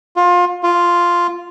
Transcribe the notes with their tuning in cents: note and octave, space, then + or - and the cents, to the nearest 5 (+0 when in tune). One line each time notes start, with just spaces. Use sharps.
F4 +25
F4 +0